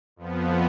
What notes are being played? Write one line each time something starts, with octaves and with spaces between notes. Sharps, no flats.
F2 F3 B3